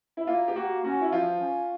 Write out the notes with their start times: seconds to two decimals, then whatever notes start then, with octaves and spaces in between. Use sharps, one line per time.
0.17 E4
0.27 A#3 F4
0.48 G4
0.56 A#3 F#4
0.84 C#4 F#4
1.01 E4
1.12 F3 F4
1.41 C#4